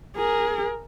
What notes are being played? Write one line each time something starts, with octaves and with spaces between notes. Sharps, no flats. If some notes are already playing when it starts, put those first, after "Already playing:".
G#4 A#4